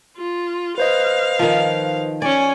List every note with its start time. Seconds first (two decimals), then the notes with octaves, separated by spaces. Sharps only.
0.17 F4
0.78 B4 C5 D#5 F5
1.39 D#3 F3
2.22 C#4 D5 G#5